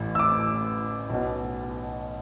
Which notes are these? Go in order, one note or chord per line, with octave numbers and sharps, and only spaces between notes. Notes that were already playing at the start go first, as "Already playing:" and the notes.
Already playing: A1 A2 E3
E6
D6
B1 B2